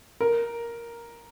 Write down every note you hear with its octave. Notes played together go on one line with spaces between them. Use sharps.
A#4